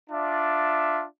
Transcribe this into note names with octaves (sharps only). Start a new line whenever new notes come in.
D4 F4 D5 E5